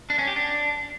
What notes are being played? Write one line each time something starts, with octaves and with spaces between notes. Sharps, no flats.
D4
C#4
G4
D4